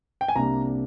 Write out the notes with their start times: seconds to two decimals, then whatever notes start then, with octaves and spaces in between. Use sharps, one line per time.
0.21 G5
0.28 G#5
0.35 C2 C3 G3 A#3 D4 A#5